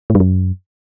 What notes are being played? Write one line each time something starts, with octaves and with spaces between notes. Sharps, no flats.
A2
G2
F#2